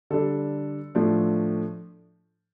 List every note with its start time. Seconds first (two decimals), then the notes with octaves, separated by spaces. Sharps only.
0.10 D3 G3 D4 A4
0.95 A2 F3 A3 D4